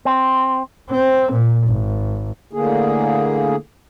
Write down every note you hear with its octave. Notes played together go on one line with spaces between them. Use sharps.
C4
C4
A#2
G#1
A2 D3 A#3 G#4